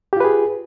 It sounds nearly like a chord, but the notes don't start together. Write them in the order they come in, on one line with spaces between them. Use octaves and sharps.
G4 F4 B4 G#4